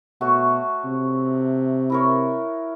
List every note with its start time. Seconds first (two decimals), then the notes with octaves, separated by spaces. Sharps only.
0.21 B2 A3 F#4 C#5
0.85 C3
1.90 E4 A#4 C#5